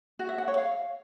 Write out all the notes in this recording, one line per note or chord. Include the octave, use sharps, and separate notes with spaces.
F#4
E5
F#5
C#5
F5